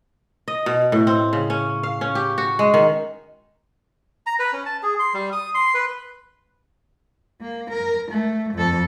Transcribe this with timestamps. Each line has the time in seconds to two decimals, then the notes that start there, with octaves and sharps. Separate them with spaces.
0.48 D#5
0.66 B2
0.92 A2
1.07 C4
1.33 C#3
1.50 C#4
1.83 F5
2.01 C#4
2.15 G4
2.38 F#4
2.59 G#3
2.74 D#3
4.26 A#5
4.39 B4
4.53 C#4
4.66 A5
4.83 G#4
4.99 C6
5.14 G3
5.32 D#6
5.55 C6
5.74 B4
7.41 A#3
7.71 A#4
8.11 A3
8.54 F2 A4